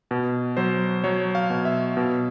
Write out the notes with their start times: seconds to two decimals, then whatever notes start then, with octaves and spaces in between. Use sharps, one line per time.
0.11 B2
0.57 F#3 C5
1.04 F#3 C#5
1.35 F5
1.50 B2
1.65 E5
1.97 B2